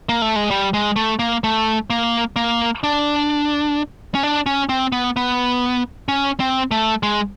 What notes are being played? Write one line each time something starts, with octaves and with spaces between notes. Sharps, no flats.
A#3
A3
G#3
G3
G#3
A3
A#3
A3
A#3
A#3
D4
C#4
D4
C#4
C4
B3
B3
C#4
C4
A3
G#3